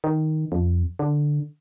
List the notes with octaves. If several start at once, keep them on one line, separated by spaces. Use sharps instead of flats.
D#3
F2
D3